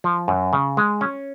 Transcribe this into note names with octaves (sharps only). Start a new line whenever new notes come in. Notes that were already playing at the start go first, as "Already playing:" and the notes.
F3
F#2
C#3
G#3
C#4